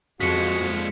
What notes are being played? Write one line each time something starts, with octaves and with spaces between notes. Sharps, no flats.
F2 F3 G#3 F#4 B6 C#7